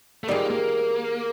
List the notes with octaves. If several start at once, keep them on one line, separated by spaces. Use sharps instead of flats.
A3
D#3 G3 A#3 C4 F4 G#4
A#3